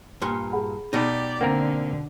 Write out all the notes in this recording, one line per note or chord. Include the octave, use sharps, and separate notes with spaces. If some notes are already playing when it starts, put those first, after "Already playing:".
G2 A#2 C6
G#4 F#5 B5
B2 D#4 G4 D5
D3 A#3 C4 A#4 F#5 G5